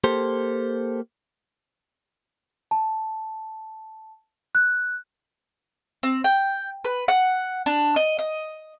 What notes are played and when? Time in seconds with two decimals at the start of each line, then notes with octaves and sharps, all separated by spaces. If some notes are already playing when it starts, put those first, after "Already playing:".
0.04 A#3 G4 A4 C5
2.71 A5
4.55 F#6
6.03 C4
6.24 G5
6.85 B4
7.08 F#5
7.66 D4
7.96 D#5
8.19 D#5